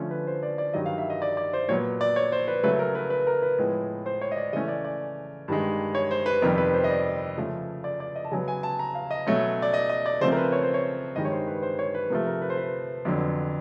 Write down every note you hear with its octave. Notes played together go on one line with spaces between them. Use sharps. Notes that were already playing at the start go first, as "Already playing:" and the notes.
Already playing: D3 F3 A3 C#4
B4
C5
D5
D5
G2 D#3 F#3 D#5
F5
E5
D#5
D5
D5
C5
A#2 F#3 B3 C#5
D5
C#5
C5
B4
C#3 F#3 A3 B4
A#4
B4
B4
A#4
B4
A2 F3 G#3 B3
C5
C#5
D#5
D5
C#3 E3 A3 C#4 D#5
D5
D5
G2 D#3 G#3
C#5
C5
B4
F2 C3 D#3 G3 B3 A#4
B4
C5
D#5
D5
C#3 F3 A3
D5
D5
D#5
A5
C#3 F#3 B3 G#5
G#5
A5
A#5
F5
D#5
B2 F#3 A3 C#4
D5
D#5
D#5
D5
C#3 F3 A3 C4 C5
A#4
B4
C#5
C5
C#5
G2 D#3 G#3 D#5
C#5
C5
B4
C5
C#5
B4
C3 F3 A3 A#4
A#4
B4
C5
B4
F2 D3 F#3 B3